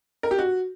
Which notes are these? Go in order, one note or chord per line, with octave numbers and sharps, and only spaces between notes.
A#4
G4
F#4